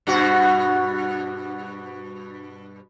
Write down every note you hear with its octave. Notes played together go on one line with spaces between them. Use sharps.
G2 B2 F#4